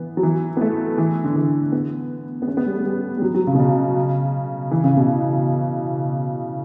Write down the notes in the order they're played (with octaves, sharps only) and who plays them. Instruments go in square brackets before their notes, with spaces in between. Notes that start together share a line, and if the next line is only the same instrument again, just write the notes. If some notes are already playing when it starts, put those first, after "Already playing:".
Already playing: [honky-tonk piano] E3 B3
F#3
E3
B3
A3
E3
D3
E3
B3
B3
C#4
B3
G3
A3
G3
G3
F#3
F#3
C#3
B2
C#3
E3
C#3
B2